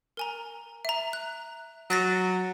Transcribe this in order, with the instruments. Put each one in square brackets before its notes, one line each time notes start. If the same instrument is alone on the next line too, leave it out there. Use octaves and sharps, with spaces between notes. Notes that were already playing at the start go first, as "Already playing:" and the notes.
[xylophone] A#4 G#5 A#5
E5 A#5
F#6
[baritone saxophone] F#3 [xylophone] F#6 A6 A#6